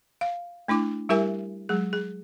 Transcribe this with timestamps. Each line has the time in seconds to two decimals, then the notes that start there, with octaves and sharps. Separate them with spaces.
0.21 F5
0.68 A3 D4 E4 D6
1.09 G3 E4 G4 A#4 E5 G#5
1.69 F#3 G#3 G#4
1.93 G#4